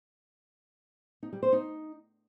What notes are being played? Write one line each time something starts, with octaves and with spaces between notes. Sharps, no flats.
D#4
G3
C5
D#4